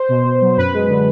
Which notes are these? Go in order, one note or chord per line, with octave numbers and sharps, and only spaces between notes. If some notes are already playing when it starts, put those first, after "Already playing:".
Already playing: C5
B2
B2
F#3
F#2 B4
G#3
D3